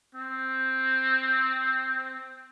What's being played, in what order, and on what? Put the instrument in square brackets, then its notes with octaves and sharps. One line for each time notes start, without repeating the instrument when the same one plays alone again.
[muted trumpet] C4